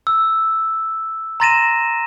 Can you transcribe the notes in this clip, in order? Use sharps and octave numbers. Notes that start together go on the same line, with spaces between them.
E6
A#5 C6 A6 A#6 D#7 E7